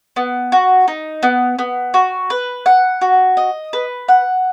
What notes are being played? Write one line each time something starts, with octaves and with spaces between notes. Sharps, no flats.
B3
F#4
D#4
B3
B3
F#4
B4
F#5
F#4
D#5
B4
F#5